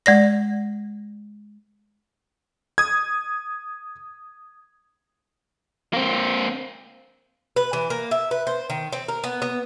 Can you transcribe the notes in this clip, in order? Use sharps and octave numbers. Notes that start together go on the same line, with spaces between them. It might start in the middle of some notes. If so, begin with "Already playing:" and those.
G#3 D5 A#6
D#6 G#6
A#3 C4
B4
E3
A#3
E5
B4
C5
D#3
C4
A#4
B3
B3